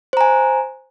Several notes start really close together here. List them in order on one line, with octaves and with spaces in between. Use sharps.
C5 A#5 G#5